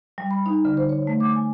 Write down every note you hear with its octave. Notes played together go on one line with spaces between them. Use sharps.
G3
B5
D#4
D3
C5
C#5
A3
D6
G#5